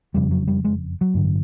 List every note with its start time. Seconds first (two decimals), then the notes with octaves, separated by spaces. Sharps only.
0.14 F#1 F2 C#3 G3
0.31 F#3
0.48 G3
0.65 G#3
1.01 F#3
1.14 A1 G2 D3